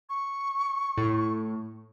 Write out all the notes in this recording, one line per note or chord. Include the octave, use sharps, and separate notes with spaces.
C#6
A2